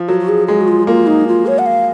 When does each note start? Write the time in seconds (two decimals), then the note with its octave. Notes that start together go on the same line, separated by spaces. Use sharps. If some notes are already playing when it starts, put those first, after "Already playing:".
Already playing: F3
0.08 F#3 F#4
0.20 F#4
0.29 G#4
0.47 G#3 G#4
0.61 F#4
0.68 F4
0.87 A#3 F4
1.07 D#4
1.28 F4
1.47 C#5
1.59 F#5
1.66 F5